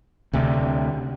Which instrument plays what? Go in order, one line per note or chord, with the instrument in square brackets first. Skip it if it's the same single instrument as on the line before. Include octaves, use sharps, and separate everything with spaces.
[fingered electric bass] D2 C3